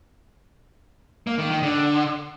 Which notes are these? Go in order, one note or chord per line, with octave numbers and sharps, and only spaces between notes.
A#3
D#3
D#3
D3